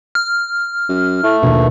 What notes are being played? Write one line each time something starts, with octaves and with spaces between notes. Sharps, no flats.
F6
F#2
A2 A3
A#1 D#2 B2